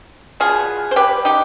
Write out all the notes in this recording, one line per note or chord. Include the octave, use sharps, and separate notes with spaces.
B2 B3 F4 G#4
C5
G4 B4
D#4 G4